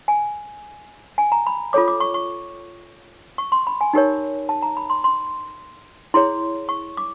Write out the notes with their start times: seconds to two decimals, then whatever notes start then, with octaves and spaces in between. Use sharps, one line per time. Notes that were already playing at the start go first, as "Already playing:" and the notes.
0.08 G#5
1.18 G#5
1.32 A#5
1.47 B5
1.73 F4 A4 C#5 D6
1.88 D6
2.00 C#6
2.14 C#6
3.38 C#6
3.52 C6
3.67 B5
3.81 G#5
3.93 D#4 G4 A#4 C#5
4.49 A5
4.62 A#5
4.77 B5
4.90 C6
5.04 C6
6.14 E4 G#4 C#5 C6
6.69 C#6
6.97 D6